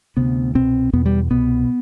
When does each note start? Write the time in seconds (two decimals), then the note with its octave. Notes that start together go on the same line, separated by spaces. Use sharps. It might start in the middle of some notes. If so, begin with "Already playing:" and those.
0.17 D2 C3 B3
0.55 C2 B2 C4
0.93 E2 B2 B3
1.06 G3
1.31 C2 B2 B3